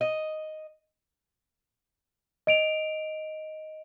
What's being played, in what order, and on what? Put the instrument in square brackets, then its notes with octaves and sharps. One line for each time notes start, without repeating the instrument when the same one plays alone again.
[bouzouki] D#5
[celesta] D#5 D7 F7